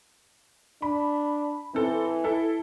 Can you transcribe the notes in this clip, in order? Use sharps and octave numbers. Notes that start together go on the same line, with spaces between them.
D4 B5
E3 C4 A4
E4 A4